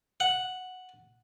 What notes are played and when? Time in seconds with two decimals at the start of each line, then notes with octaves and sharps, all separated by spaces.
0.20 F#5